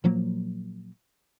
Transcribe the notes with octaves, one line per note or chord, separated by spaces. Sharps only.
A#2 F3 F#3 A#3